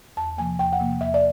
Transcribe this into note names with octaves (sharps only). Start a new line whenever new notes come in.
E2 A5
C3 F3 A#3 G#5
E2 G5
F#5
C3 F3 A#3
E2 E5
D5